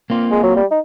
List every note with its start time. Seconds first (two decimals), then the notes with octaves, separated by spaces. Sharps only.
0.10 A#3 C4 F4
0.32 G#3
0.43 F#3
0.56 G3
0.71 D#4